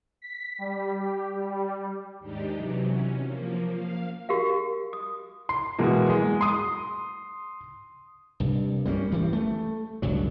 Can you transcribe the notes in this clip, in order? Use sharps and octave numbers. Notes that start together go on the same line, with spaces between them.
B6
G3
G4
G3
D#2 G#2 D4 D#4 G4
C3 E3 F#3
C#4
F3 A#3
F5
F#4 G4 A#4 F5
D#6
C6
B2 E3 G#3 A#3
G#3
C6 D#6
C2 G2
G3 A#3 B3 C#4
G2 E3 G3
A3
F#1 C#2 G2 F#3